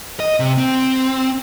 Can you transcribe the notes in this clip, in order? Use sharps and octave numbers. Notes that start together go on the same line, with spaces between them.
D#5
C3
C4